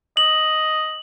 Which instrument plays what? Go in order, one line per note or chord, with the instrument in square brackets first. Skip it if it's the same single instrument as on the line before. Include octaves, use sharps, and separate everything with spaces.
[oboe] D#5 [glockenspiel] F#7